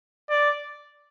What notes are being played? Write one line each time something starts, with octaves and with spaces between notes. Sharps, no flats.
D5